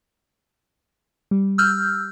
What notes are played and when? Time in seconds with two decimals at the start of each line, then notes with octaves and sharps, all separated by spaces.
1.31 G3
1.58 E6 F6 G6